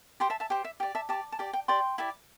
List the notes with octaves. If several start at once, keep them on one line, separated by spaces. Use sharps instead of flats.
G4 C5 G5 C6
E5 A5
E5 A5
G4 C5 G5
E5
G4 D5 G5
E5 A5
G4 D5 A5 D6
A5
G4 D5 G5
G5
G4 D5 G5 C6
E4 G4 D5